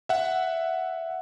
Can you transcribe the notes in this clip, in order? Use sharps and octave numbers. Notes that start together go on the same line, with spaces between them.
E5 F#5